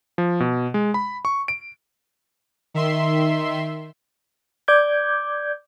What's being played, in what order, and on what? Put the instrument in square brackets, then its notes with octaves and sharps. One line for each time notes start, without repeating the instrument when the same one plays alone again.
[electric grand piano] F3
B2
G#3
B5
C#6
D7
[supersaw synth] D#3 E5 C6
[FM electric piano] D5 D6 G6 G#6